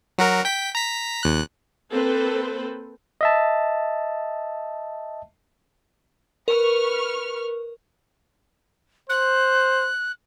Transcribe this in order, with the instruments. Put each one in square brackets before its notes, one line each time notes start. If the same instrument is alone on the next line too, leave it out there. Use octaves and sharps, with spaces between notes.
[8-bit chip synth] F#3 F#4 A#4
G5 B6
A#5 B6
D#2 F#6
[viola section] A#3 C4 A4 B4 C5
[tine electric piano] D#5 E5 A5
[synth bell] A#4 [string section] B4 C#6 F6
[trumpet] C5 [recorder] F#6